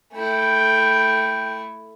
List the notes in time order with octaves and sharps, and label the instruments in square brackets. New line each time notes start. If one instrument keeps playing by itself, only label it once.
[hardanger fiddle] A3 E4 [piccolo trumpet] G5